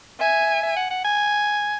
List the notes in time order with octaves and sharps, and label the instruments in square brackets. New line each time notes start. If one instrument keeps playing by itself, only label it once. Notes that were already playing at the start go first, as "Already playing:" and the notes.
[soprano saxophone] E5 [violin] G#5
[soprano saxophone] E5
F#5
F#5
G#5